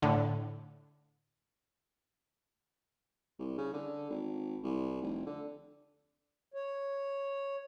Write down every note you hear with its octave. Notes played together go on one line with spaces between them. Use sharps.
A2 D3
C2
C#3
D3
G#1
C2
F1
D3
C#5